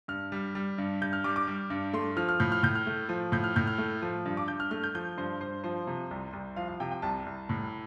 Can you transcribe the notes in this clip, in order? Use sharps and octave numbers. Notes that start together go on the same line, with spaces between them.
G2 F6
G3
G3
G2
G2 G6
F6
G3 D6
D6
G3
G2
A3 C6
F3 F6
F6
A2 G6
F6
A2 G6
F6
A3
F3
A2 G6
F6
A2 G6
F6
A3
F3
G2
D6
G2 G6
F6
A3 F6
G6
F3 G6
G2 C5
G2 C5
F3 C5
C3
C2
C2
F3 F5
F5
C3 G5
G5
C2 A5
C2
A2